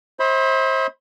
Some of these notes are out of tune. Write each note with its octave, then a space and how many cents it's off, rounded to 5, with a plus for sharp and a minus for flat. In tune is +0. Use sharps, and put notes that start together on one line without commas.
C5 +30 E5 -45 B5 +10